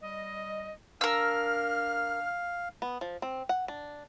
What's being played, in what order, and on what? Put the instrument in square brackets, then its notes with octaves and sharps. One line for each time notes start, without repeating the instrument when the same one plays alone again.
[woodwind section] G3 D#5
[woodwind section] D4 F6 [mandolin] A#4 E6 [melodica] F5
[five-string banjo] B3
F3
C4
F#5
D4